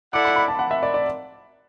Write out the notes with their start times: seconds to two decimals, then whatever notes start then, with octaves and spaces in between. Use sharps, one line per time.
0.13 E4 A4 D5 F#5 D6
0.25 B5
0.36 B5
0.48 A5
0.59 F#5
0.71 E5
0.83 D5
0.94 D5